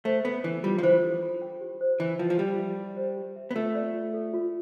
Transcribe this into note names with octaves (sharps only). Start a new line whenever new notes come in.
A3 C5
B3 A4
E3 D4
G3 F4
F3
E3 C5
A4
B5
G5
G4
C5
E3 B5
F3 G5
F3
G3 G4
E5
G4
C5
G4
E5
B3
A3 F4
D5
F4
A4
F4